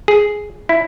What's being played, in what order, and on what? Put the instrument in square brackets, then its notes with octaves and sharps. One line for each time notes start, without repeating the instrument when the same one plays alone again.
[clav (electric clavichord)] G#4
E4